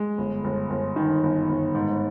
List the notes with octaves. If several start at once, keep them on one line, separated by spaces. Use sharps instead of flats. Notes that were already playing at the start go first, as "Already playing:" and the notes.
Already playing: G#3
G1
G1
G1
D#3
G1
G1
G#2